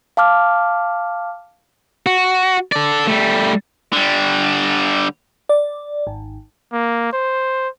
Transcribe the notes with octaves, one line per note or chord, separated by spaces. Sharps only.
F5 A5 D6 F6
F#4
A4 D5
G3 A3
D3 G3
D5
G#1
A#3
C5